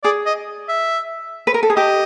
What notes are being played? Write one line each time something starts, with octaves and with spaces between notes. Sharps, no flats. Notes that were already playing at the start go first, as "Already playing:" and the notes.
G#4 D5
D#5
E5
B4
A#4
A4
G#4
G4 D#5